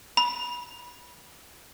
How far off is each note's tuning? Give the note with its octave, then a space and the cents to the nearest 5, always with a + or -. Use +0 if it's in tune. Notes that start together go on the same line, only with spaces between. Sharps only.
B5 -20